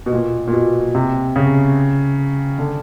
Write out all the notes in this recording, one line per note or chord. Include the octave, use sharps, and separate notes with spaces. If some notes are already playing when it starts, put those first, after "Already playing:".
B2
A#2
A#2
B2
C3
C#3
D3